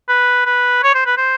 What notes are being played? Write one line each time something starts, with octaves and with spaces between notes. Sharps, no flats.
B4
B4
C#5
C5
B4
C5